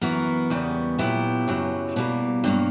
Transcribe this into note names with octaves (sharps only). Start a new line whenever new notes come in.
F#2 E3 B3 F#4 A#4
E2 C#3 G3 B3
A#2 F#3 B3 E4 G4
F#2 C#3 F#3
B2 G3 A#3
G2 F#3 A#3